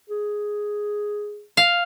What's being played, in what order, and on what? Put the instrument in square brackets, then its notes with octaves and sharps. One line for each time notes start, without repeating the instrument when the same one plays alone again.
[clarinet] G#4
[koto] F5